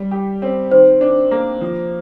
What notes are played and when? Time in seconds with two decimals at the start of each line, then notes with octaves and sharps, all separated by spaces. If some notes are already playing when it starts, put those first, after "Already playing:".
Already playing: G3
0.11 G4
0.42 C4
0.71 D#3 C5
1.01 D4
1.31 A#3
1.61 F3